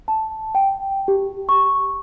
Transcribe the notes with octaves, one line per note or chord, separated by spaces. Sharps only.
A5
G5
G4
C#6